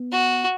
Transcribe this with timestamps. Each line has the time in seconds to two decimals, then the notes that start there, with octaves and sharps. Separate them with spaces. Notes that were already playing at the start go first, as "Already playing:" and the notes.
Already playing: B3
0.12 F#4